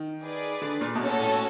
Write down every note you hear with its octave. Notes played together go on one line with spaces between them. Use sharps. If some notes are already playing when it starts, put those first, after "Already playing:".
Already playing: D#3
G#4 B4 D5
D3
A#2
B2
A#2 C#4 F#4 A4
A2